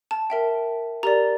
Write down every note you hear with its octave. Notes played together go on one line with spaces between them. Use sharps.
A5
A#4 E5 G5
G4 A#4 D5 A#5